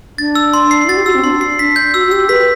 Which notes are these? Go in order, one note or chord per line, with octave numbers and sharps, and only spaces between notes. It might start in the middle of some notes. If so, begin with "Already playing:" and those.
D4 A6
E6
C6
C7
E4
F#4 A6
G4
F#4 E6
C4
D4 C6
C7
D4 B6
G6
F#4 E6
F#4
G4 E6
B4 B6